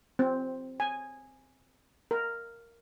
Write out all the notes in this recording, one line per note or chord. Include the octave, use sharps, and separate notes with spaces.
C4
G#5
A#4